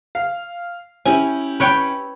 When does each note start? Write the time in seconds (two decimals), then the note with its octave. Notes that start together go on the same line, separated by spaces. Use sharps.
0.15 F5
1.05 C#4 E4 G4 G#5
1.60 B4 C#5 G5